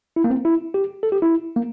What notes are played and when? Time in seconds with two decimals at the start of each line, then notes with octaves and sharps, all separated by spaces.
0.16 E4
0.24 A#3
0.30 C4
0.45 E4
0.74 G4
1.03 A4
1.12 G4
1.22 E4
1.56 A#3